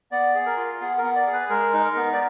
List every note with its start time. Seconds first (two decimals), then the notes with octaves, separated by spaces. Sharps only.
0.12 B3 D5
0.34 G#4
0.46 A#4
0.57 F4
0.81 B3 G#4
0.98 A#4
1.04 B3
1.15 D5
1.27 G#4
1.33 B4
1.49 G#3 A#4
1.74 D#4
1.85 A#4
1.96 B3
2.13 D5